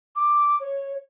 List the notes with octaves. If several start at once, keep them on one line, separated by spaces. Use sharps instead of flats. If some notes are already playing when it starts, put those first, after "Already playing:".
D6
C#5